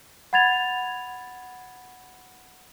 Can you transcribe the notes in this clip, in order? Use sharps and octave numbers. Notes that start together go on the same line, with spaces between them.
F#5 B5 G#6 A6 F7